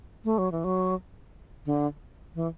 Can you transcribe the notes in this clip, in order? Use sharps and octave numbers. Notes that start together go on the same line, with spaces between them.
A3
F#3
E3
F#3
D3
E3